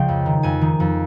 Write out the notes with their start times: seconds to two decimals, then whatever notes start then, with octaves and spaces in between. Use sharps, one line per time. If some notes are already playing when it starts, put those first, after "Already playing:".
Already playing: C#2 C#3 F3 F4 D#5 F5 G5
0.09 F2
0.26 D#3
0.43 F2 G#5
0.61 D#3
0.80 F2